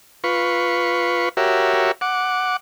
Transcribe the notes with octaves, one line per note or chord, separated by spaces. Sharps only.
F4 B4 C#6
F#4 G4 A#4 C#5 E5
F#5 D6